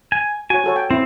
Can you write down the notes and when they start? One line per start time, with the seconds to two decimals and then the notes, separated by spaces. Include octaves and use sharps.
0.12 G#5
0.50 F#4 C#5 G#5
0.64 F#4 A4 C#5
0.76 G5
0.91 C4 E4